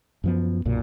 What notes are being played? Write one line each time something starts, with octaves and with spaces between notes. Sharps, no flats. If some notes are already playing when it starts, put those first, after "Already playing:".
F#2 F3 B3
B1 F#2 A#2